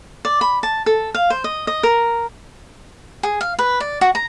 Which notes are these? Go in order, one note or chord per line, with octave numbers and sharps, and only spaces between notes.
D5
B5
A5
A4
F5
C5
D#5
D#5
A#4
G#4
F5
B4
D5
F#4
A#5